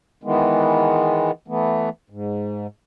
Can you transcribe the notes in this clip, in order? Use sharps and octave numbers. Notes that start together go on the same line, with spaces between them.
D#3 E3 G#3 B3
E3 A3 B3
G#2